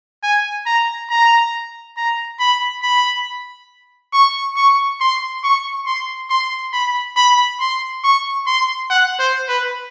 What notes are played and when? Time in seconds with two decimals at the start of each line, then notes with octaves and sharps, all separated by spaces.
0.24 G#5
0.67 A#5
1.10 A#5
1.97 A#5
2.40 B5
2.83 B5
4.14 C#6
4.56 C#6
5.01 C6
5.44 C#6
5.86 C6
6.30 C6
6.73 B5
7.17 B5
7.60 C6
8.04 C#6
8.47 C6
8.90 F#5
9.19 C5
9.49 B4